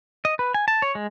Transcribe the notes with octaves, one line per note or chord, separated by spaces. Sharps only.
D#5
B4
G#5
A5
C#5
G#3